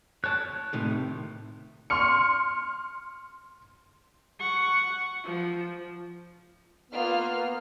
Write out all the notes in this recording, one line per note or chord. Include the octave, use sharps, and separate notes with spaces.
C#5 A5 F#6
A2 C3 D#3
C6 C#6 F6 C#7
F#5 C#6
F3
A#3 B3 F4 B4 F6